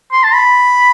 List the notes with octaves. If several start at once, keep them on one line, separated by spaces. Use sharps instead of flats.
C6
A5
B5